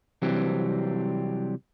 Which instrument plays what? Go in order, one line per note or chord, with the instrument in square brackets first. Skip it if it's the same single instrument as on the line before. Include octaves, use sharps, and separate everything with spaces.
[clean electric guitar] C3 E3 F#3 G3 C4